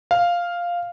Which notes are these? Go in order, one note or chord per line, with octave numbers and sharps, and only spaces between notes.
F5